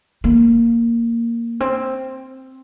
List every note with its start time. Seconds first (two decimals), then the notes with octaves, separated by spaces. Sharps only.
0.24 A#3
1.60 C4